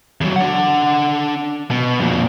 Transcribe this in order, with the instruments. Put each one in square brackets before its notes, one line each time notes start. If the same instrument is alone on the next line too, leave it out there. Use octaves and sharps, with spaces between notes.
[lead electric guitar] E2 F#3
D4 F#5
B2
F2 A#2